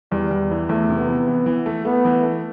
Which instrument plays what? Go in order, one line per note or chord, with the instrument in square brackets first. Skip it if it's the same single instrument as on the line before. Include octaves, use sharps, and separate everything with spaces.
[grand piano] E2 [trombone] G3
[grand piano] E2
E3
[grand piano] E2 [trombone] A3
[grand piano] C3
[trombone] B3
[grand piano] E3
E3
E3
A3
[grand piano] A3 [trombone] B3
[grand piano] E3
A3